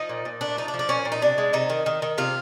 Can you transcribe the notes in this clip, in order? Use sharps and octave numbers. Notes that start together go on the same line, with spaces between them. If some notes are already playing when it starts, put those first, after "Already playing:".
Already playing: F3 D#4
A#2
A#2
A3 D4
F3 D#4
D4
F3
D4
A#2 C#4
A#2
D#4
C3 D4
G#3
C3 D#4
D#3
D#3
D#3
C3 F4